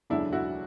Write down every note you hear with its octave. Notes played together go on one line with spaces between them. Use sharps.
E1 D2 C#3 F#3 A3 D4 E4
E4 F#4